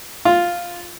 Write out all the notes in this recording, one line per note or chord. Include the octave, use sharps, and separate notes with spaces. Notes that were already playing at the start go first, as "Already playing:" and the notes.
F4